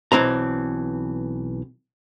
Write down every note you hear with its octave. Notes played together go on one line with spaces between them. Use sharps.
B1 E3 C4 A#5